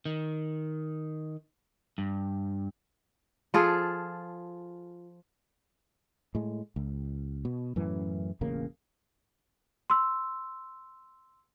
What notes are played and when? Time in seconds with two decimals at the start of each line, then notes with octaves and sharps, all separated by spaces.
0.06 D#3
1.98 G2
3.54 F3 F4 G#4 A4
6.35 A2 G#3
6.76 C#2
7.45 B2
7.76 F#2 A2 E3
8.41 E1 A1 C#3 A#3
9.90 C6 E6